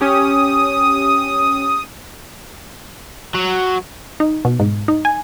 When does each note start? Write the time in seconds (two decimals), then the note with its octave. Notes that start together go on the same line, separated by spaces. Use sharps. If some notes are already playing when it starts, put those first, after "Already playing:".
0.01 C#4 G4 D#6
3.34 F#3
4.20 D#4
4.45 B2
4.60 G#2
4.88 D#4
5.05 G#5